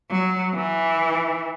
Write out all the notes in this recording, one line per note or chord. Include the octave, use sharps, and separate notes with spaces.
F#3
E3